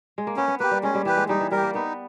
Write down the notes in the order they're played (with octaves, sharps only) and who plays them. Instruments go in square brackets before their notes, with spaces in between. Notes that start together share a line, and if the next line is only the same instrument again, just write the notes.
[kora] G#3
A#3
[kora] B3 [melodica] C#4
[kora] B3
[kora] A#3 [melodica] G4 B4
[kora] G3
[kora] G#3 [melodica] C#4
[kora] G3
[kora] E3 [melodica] G4 B4
[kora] G#3
[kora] G3 [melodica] D#4
[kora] E3
[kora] G3 [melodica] G4 A#4
[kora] A#3
[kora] B3 [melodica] D#4